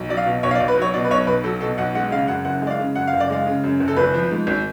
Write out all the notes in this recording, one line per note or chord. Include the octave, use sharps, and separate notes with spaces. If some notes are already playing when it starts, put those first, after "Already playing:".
Already playing: B1
F#3 D5
F5
B2
B1 C#5
F5
D5
B1
B4
F#3 C#5
B2 D5
B4
B1 C#5
B1 B4
F#3 A4
B2 A4
B1 F#5
G#3 F#5
C#3 F5
F#2 F#5
F#1 F#5
G#3 D5
F5
C#3
F#2 F#5
F5
F#1
D5
G#3 F5
C#3
F#2
F#1
A4
G#1 B4
F3
G#2
G#1